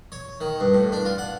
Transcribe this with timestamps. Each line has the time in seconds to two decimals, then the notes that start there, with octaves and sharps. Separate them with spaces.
0.12 C#5
0.41 D#3
0.60 G2
0.74 A2
0.92 D4
1.05 F4
1.18 F#5